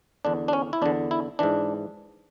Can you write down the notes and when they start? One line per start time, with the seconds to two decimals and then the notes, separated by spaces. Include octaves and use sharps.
0.25 E2 D3 D4
0.48 D4
0.53 C#4
0.73 E4
0.82 E2 D3 D4
1.11 E4
1.39 G#2 E3 D4